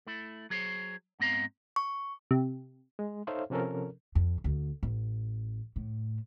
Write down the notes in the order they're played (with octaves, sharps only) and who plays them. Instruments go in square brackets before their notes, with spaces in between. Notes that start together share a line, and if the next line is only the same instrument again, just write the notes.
[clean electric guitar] A3 E4
F#3 G#4 C5 C#5
G#2 B3 C4 D#5 F5 A#5
[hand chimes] C#6
[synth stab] C3
[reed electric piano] G#3
D#4 A4 C5 C#5 E5 F5
C3 F3 C#4 A4 A#4
[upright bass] F2
D2
A1
A2